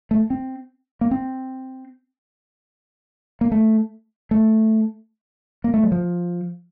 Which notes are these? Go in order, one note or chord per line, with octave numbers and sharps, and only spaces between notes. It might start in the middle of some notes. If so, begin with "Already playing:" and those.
A3
C4
A#3
C4
A#3
A3
A3
A#3
A3
F#3
F3